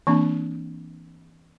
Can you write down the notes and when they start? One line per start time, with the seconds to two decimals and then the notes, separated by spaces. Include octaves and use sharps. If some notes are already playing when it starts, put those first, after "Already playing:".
0.07 E3 A#3 C4 D4